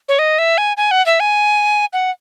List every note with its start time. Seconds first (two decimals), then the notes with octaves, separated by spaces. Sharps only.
0.09 C#5
0.19 D#5
0.39 E5
0.58 G#5
0.77 G#5
0.91 F#5
1.06 E5
1.20 G#5
1.93 F#5